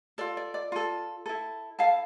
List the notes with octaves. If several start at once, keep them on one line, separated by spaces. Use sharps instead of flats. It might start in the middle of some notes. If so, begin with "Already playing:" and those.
F4 A4 D5
D5
D5
F4 A4
E4 A4
E4 A4 F5 A5